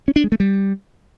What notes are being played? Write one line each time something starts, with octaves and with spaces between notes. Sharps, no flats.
C#4
D4
G#3
A3
G3